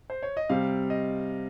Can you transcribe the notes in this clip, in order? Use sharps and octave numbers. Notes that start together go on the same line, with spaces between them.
C5
C#5
D#5
C3 G3 C4 F5
D#5